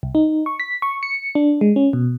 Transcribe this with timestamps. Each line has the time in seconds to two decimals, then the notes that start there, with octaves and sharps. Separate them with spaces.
0.03 C2
0.15 D#4
0.46 C#6
0.60 B6
0.82 C#6
1.03 C#7
1.35 D4
1.61 G#3
1.76 C#4
1.93 B2